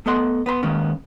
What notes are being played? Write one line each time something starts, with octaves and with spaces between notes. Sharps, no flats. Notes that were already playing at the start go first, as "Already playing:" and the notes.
A3 B3 A4 D#5 F#5 C6
B3 B4 B5 C6
D#3 G#3 A#3 B3 C#4